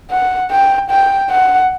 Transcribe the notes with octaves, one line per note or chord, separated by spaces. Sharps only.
F#5
G5
G5
F#5